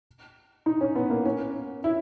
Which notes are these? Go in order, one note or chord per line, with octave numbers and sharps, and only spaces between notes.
D#4
C#4
B3
A#3
C#4
E4